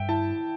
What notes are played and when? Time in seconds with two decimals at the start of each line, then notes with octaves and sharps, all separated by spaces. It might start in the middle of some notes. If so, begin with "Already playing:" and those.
Already playing: G2 E5 G5
0.09 E4 A5